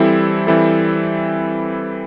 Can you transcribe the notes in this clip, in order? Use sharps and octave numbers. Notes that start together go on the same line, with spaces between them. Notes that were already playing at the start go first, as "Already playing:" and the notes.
Already playing: E3 G3 C4 E4 A4
E3 G3 C4 E4 A4